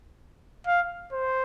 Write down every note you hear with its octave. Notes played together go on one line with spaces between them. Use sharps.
F5
C5